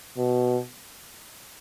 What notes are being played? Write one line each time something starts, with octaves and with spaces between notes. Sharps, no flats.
B2